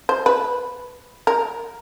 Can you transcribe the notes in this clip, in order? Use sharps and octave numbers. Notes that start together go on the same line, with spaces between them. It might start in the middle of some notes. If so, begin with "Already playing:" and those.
C5
B4
A#4